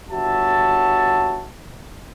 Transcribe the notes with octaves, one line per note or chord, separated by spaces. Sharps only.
G1 F#4 C#5 E5 A5